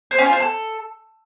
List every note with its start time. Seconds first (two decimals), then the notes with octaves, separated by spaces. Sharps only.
0.11 C5
0.18 C#4
0.26 F4
0.33 C5
0.40 A4